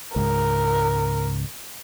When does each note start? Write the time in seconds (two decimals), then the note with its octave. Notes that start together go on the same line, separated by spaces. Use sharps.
0.16 C#2 G#2 A#4